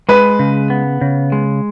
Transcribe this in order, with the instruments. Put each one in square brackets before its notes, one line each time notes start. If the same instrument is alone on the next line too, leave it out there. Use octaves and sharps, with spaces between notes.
[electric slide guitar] G#3 [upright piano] B4
[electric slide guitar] C#3
B3
C#3
G#3